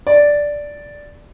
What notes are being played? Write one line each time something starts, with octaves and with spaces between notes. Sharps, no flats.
D5